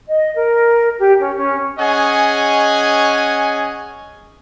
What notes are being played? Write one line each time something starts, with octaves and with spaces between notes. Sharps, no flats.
D#5
A#4
G4
C#4
C#4
C#4 G#4 D#5 F#5 G#5